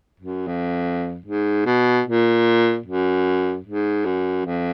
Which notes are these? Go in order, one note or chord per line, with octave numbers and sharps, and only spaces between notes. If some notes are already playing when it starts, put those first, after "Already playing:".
F#2
F2
G#2
B2
A#2
F#2
G#2
F#2
F2